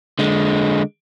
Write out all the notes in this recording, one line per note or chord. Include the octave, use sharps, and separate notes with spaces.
D3 G#3